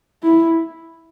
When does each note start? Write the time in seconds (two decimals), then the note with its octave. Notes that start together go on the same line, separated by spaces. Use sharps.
0.23 E4